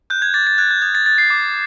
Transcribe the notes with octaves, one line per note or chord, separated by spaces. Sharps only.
F#6 G6
G#6
D6 A6
A6
F#6 G#6
G6
D#6 G#6
A6
F#6 A6
C7
D6